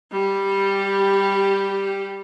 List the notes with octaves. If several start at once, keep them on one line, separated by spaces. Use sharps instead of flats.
G3 G4